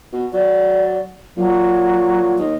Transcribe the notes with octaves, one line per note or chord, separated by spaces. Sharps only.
B2
F#3 D5
A#2 F#3
D#2 D#5